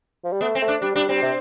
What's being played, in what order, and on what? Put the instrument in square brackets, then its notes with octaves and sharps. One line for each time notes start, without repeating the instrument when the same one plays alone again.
[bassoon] F3
G3
[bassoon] A3 [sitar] B3
[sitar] C4
[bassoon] A3
[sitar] D4
[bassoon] G3 [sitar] D4
[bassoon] G3 [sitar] D4
[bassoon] G3 [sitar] C4
[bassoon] C3